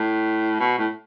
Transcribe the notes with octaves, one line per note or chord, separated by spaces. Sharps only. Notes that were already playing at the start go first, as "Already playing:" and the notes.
Already playing: A2
B2
A2